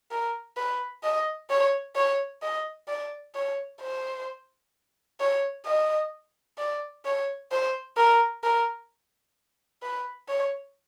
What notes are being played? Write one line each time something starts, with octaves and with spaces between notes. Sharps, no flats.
A#4
B4
D#5
C#5
C#5
D#5
D5
C#5
C5
C#5
D#5
D5
C#5
C5
A#4
A#4
B4
C#5